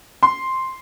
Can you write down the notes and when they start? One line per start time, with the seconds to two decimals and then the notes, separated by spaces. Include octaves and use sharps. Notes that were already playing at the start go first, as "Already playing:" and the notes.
0.23 C6